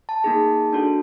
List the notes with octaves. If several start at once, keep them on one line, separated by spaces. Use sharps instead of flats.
A5
A#3 D#4 G#4
D4 F#4 A4